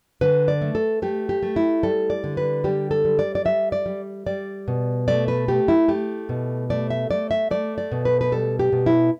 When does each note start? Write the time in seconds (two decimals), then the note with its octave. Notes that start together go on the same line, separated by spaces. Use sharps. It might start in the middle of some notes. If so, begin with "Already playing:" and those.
0.21 D3 B4
0.48 D5
0.62 A3
0.75 A4
1.02 A3 G4
1.29 G4
1.43 A3
1.56 E4
1.83 G3 A4
2.10 D5
2.24 D3
2.37 B4
2.64 G3 G4
2.91 A4
3.05 G3
3.19 D5
3.35 D5
3.45 G3 E5
3.72 D5
3.86 G3
4.26 G3 D5
4.68 B2
5.08 A3 D5
5.28 B4
5.48 A3 G4
5.68 E4
5.88 A3 G4
6.29 B2
6.70 A3 D5
6.90 E5
7.11 A3 D5
7.31 E5
7.51 A3 D5
7.78 D5
7.92 B2
8.05 B4
8.21 B4
8.32 G3 A4
8.59 G4
8.72 B2
8.86 E4